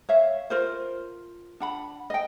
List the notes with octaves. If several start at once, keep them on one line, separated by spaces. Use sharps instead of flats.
C#5 E5 F5
F4 A#4 C5
D4 F#5 B5
D#5 G5